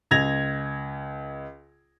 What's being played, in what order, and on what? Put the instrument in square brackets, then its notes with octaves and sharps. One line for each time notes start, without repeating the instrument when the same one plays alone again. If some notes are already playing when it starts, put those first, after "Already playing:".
[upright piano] C#2 G#6 A#6 F7